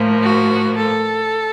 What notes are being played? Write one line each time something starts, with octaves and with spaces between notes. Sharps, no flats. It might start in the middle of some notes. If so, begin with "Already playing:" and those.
Already playing: A2 F3 A#3
F#4
A4